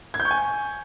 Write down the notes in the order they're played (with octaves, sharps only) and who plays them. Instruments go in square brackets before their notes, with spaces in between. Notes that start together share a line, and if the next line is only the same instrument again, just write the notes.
[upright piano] G#6
G6
C#6
G#5